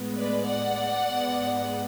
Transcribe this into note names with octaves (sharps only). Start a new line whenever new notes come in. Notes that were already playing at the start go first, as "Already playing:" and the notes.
Already playing: A2 G#3 B3
B4 D5
D5 F#5
G#2 G#3 B3